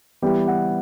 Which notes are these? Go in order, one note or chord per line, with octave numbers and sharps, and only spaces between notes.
E3 G3 B3 G4
F#5